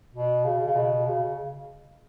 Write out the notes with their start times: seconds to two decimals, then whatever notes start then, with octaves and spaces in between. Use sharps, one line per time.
0.14 B2
0.44 C#3
0.66 C#3
0.75 B2
1.07 C#3